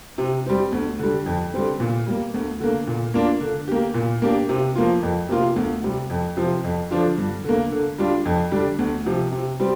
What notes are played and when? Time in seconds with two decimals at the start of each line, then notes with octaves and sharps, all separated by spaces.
0.18 C3
0.46 G3 C4
0.72 D2
0.99 D3 G3
1.26 F2
1.54 D3 G3 C4
1.80 A#2
2.07 G3 A#3
2.34 D2
2.60 D3 A#3
2.87 A#2
3.14 A#3 D4 F4
3.41 D3
3.68 A#3 G4
3.94 A#2
4.22 A#3 D4 G4
4.49 C3
4.76 F3 A#3 F4
5.02 F2
5.29 C3 A#3 F4
5.56 D2
5.83 C3 G3
6.10 F2
6.37 C3 F3 C4
6.64 F2
6.91 D3 F3 D4 F4
7.18 G2
7.44 D3 A#3
7.72 D3
7.98 G3 D4 F4
8.25 F2
8.52 D3 G3 D4
8.79 D2
9.06 C3 F3
9.32 C3
9.60 G3 C4